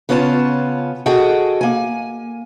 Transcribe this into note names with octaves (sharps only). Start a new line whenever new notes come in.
C#3 B3 C#4 F4 F5 A5
F#4 G#4 A4 D#5 F#5 G5
A#3 G#5